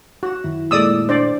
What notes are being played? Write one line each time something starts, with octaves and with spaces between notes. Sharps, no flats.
F#4 F#6 A#6 E7
F#2 D#3 E4
A#2 G#3 A3 D5 D#6 E6
D4 C5 D5